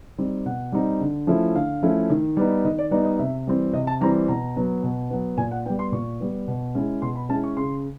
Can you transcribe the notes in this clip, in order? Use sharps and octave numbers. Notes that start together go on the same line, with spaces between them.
G3 C4 D#4
B2 F#5
G3 C4 D#4
D3
F3 A3 C#4 E4
D3 F5
F3 A3 C#4 E4
D#3
G3 B3 D#4
D#3 D#5
D5
G3 B3 D#4 D5
D#5
C3 E5
E3 G3 C4
C3 D#5
A5
E3 G3 C4 A#5
B2 A#5
F#3 B3
B2
F#3 B3
A#2 G#5
F#5
G3 B3 G5
C6
A#2 C#6
G3 B3
B2
G#3 C#4 E4
B2 C6
B5
G#3 C#4 E4 A5
C#6
C#3 C6